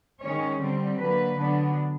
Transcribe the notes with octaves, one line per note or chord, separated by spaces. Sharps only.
D#3 G#3 C#4 C#5
D3 G3 C4
D3 F#3 A#3 B4
D3 F#3 B3 D4